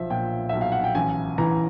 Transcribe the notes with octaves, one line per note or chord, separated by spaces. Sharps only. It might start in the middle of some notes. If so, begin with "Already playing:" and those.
Already playing: B1 F3 E5
A#2 G5
B1 E5
F5
F#5
G5
A1 G#5
E3 A#5